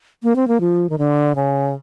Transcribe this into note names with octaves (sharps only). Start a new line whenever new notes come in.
A#3
C4
A#3
F3
D#3
D3
C#3